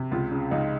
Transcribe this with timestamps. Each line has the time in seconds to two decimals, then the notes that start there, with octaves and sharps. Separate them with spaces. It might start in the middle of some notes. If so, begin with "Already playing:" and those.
Already playing: C3
0.11 C#2 F4
0.31 C#3
0.51 C#2 D#4